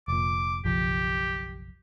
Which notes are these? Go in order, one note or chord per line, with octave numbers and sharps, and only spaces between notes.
F1 A#2 D6
F#1 B1 F3 G4